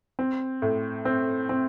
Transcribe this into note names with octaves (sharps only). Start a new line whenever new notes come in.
C4
A2
C4
C4